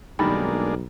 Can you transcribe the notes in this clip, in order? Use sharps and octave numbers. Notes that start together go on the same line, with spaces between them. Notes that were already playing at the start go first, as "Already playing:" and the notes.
B1 D#3 G3 G#3 A#3 D4 B5